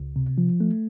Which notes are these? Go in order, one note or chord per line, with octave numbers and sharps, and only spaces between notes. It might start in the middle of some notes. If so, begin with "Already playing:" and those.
Already playing: C#2
C3
F3
A3